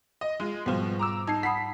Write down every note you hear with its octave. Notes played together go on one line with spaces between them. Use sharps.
D#5
G#3 F4
G#2 B2 F3 G3 F4
A#5 D6 E6
D#4 A5 G#6 C7
F#5 B5 D#6 B6 C7